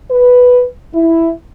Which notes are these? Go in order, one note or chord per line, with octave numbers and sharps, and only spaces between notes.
B4
E4